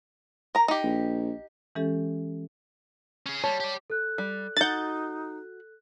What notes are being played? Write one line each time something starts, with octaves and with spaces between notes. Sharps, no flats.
A#4 A#5
D#4 G4
A#1
E3 G#3 C#4 G4 A4 E5
C#4 G#4
G3 C#5 A5
G4 D5
A4 F#6
G3
D#4 F#4 F#5 G6 A6